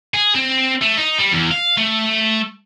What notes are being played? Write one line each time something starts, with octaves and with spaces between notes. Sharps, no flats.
G#4
C4
A3
D#4
G3
E2
F5
A3